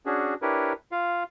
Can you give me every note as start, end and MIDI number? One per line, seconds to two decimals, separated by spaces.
0.06 0.34 61
0.06 0.34 62
0.06 0.34 66
0.06 0.34 68
0.42 0.73 62
0.42 0.73 64
0.42 0.73 67
0.42 0.73 70
0.42 0.73 71
0.42 0.73 73
0.92 1.24 65
0.92 1.24 77